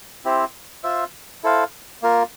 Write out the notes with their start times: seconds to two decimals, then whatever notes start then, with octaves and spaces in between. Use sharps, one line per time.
0.24 C4 E4 G4 C5
0.83 F4 C5 E5
1.43 E4 A4 C5 F5
2.02 A#3 F4 A#4